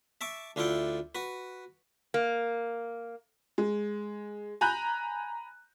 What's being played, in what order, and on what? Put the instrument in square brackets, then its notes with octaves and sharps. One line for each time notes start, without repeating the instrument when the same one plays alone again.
[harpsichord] E5 A5 C#6 D6
D2 D4 E4 F4 A4 G5
F#4 B4
[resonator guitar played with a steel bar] A#3
[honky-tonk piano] G#3
G#5 A#5 B5 F#6 G6